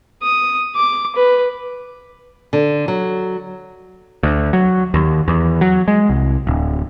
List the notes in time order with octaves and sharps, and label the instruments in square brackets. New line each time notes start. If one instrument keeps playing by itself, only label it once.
[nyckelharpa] D#6
D6
B4
[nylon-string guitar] D3
F#3
[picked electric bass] D2
F#3
D#2
E2
F#3
G#3
C2
D1